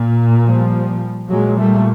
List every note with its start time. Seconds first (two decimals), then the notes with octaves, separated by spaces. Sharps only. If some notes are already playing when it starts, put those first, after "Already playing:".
Already playing: A#2
0.45 F3 G3
1.29 A#2 F#3 G#3
1.57 G3 A3